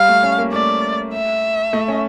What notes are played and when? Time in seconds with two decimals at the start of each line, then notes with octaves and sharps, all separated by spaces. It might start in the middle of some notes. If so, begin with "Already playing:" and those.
Already playing: G3 F5
0.08 A3
0.23 C#4
0.38 A#3
0.53 A3 D5
1.13 E5
1.73 A3
1.88 C#4